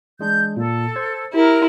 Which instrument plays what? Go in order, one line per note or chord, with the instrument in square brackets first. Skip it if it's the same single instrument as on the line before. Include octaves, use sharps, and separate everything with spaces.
[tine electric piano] E3 G#3 D4 [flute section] G6
[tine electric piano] A#2 A#3 [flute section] A4
[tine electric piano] C5 G#6
[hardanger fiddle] E4 [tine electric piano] G4 [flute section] A#4